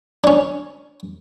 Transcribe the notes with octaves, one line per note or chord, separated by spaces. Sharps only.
C#4 D4